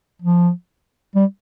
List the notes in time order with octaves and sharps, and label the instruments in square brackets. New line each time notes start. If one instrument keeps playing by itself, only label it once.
[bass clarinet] F3
G3